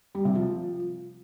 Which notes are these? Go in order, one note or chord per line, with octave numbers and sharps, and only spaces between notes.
G3
C3
F3